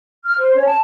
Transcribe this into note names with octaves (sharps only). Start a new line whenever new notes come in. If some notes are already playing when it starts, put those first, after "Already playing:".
F6
C5
C#4 C#5
A5